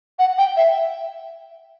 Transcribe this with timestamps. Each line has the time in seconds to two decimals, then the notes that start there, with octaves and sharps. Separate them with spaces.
0.19 F#5
0.38 G5
0.57 E5